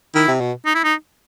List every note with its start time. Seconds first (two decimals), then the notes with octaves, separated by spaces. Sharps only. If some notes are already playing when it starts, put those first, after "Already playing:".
0.15 D#3 E4
0.28 C3
0.41 B2
0.66 D#4
0.75 E4
0.84 D#4